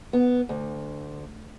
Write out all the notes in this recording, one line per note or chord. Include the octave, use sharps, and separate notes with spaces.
B3
D2